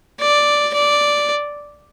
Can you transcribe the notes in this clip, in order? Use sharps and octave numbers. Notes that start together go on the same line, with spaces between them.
D5
D5